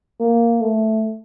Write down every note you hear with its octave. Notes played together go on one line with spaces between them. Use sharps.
A#3
A3